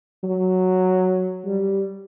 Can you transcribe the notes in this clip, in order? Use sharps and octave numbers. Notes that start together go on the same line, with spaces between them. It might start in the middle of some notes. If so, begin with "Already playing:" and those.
F#3
G3